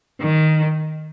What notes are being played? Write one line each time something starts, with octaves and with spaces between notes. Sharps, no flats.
D#3